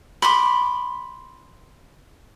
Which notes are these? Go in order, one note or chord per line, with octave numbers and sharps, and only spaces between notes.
B5 C6 D6